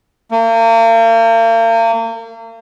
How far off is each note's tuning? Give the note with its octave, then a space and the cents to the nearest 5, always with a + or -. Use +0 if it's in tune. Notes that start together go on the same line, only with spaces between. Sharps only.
A#3 -40